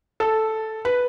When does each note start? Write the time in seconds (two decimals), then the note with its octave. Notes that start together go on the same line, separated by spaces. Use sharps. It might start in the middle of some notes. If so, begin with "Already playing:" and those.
0.20 A4
0.85 B4